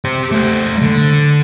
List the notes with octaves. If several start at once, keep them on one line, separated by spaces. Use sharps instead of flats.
G4 C5
A3 C5
D3